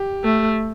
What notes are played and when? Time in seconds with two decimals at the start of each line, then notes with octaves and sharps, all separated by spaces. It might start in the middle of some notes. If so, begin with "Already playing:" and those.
Already playing: G4
0.24 A3